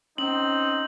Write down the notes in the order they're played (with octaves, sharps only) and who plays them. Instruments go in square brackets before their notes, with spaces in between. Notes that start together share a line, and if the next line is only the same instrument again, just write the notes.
[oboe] C4 [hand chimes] C#4 [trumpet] D#4 [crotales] F#7